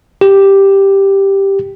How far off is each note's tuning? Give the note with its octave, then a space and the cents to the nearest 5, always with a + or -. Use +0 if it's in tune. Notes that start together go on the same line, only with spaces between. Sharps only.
G4 +0